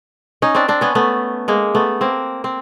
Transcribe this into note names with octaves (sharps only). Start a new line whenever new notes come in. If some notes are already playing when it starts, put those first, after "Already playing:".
C#4 D#4
C4 D4
C4 D4
B3 C#4
A3 B3
G#3 A#3
A3 B3
A#3 C4
C4